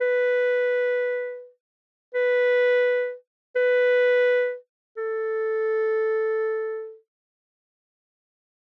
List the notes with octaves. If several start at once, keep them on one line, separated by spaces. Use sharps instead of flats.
B4
B4
B4
A4